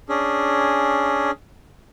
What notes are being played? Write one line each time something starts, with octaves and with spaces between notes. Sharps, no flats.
C#4 D4 G#4